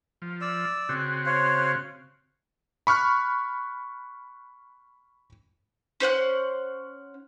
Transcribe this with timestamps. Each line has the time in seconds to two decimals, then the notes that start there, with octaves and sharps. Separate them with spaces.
0.22 F3
0.41 D5 E6
0.89 C#3 C4 F#4
1.26 C5 C#5 F5
2.87 B5 C#6 F6 F#6
6.00 C#4 C5 F#5 F#6